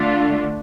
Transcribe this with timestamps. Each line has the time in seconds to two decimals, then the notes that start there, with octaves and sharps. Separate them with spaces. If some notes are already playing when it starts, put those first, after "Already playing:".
Already playing: D3 A3 D4 F4